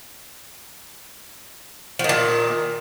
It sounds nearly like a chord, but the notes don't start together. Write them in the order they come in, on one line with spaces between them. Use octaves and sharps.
F3 D#3 A#2